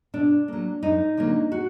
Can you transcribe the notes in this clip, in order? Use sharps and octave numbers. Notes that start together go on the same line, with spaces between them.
B2 D4
F#3 A#3
F#2 D#4
D3 F#3 A#3
F#4